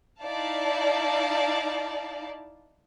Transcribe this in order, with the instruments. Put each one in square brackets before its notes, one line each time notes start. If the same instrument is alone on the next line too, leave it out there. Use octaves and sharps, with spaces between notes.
[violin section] D#4 E4 D5 F5 A5